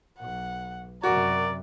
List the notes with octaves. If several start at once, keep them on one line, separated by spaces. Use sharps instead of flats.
B1 F#5
F#2 C3 F#4 A#4 D5